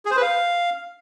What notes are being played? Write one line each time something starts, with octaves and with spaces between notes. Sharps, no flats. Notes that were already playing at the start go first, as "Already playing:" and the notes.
G#4
C5
B4
F5